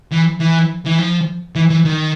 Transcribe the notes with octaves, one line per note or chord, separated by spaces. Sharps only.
E3
E3
E3
F3
E3
E3
D#3